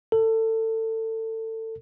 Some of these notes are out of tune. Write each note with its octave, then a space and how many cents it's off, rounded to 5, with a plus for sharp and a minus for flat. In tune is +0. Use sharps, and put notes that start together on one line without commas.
A4 +25